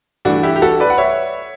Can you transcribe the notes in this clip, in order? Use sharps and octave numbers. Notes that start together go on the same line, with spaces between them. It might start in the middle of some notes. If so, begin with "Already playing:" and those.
G2 E3 A3 D4 F#4
E4 G4
G4
F#4 A4
B4 D5
F#5
C#5 E5